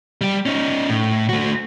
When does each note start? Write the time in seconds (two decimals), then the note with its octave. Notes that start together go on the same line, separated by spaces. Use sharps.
0.21 G3 G4
0.46 C#4 D#4
0.89 A2
1.29 A3 F#4